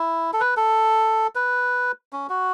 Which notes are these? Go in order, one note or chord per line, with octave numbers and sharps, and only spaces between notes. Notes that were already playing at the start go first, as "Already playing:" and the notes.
Already playing: E4
A4
B4
A4
B4
C#4
F#4